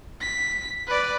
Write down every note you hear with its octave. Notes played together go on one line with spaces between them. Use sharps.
B6
B4 D5